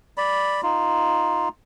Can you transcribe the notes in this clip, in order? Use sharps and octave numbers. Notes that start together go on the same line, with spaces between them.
D5 B5
D#4 F4